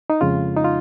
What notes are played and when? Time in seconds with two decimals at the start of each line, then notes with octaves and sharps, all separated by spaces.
0.10 D#4
0.21 F2 C#3 G#3 F4
0.56 D#4
0.64 F4